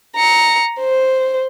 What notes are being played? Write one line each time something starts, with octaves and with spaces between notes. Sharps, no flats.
A#5 C#7
C5